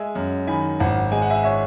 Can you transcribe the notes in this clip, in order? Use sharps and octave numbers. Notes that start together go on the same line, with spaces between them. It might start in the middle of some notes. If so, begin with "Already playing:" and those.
Already playing: G#3 E5 G#5
F#2
D#3 G#5 B5
G#1 F#5 A5
G#3 G#5
F#5
E5 G#5
C#5 E5